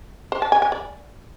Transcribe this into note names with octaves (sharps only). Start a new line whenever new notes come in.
C5
A5
G#5
G#5
D5